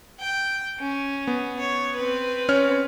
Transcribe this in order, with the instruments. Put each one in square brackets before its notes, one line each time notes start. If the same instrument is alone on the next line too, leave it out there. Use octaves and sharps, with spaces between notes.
[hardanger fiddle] G5
C#4
[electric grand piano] B3
[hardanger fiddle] C#5
C4 B4
[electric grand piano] C#4 C#5 F6